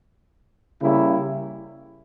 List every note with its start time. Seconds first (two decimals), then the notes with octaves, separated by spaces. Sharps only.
0.81 C#3 G3 A#3 E4